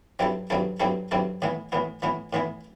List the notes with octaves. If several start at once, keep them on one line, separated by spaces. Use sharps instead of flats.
G2 F#3 C4 E4 A4
G2 F#3 C4 E4 A4
G2 F#3 C4 E4 A4
G2 F#3 C4 E4 A4
A2 E3 B3 E4
A2 E3 B3 E4
A2 E3 B3 E4
A2 E3 B3 E4